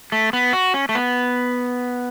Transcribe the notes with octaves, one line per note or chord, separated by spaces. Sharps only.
A3
B3
F#4
C#4
A3
B3